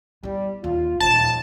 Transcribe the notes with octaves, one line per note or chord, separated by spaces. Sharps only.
G3 B3 E4
D#2 F4
D#1 A2 D#3 F3 A5